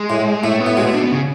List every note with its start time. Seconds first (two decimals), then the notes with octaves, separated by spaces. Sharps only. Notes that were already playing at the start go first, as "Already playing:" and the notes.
Already playing: G#3
0.10 A2
0.43 A2 A3
0.60 B3
0.66 A2
0.77 B2 G#3
0.86 A3
0.94 D4
1.03 B3
1.12 C#3